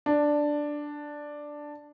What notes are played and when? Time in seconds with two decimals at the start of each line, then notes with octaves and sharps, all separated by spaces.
0.06 D4